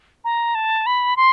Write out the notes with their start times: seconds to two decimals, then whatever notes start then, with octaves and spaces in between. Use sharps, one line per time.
0.24 A#5
0.55 A5
0.86 B5
1.17 C6